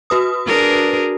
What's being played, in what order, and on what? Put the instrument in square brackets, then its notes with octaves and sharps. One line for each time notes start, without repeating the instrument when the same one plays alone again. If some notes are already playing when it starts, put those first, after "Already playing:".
[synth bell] F#4 B4 D#6
[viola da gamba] D4 G#4 A#4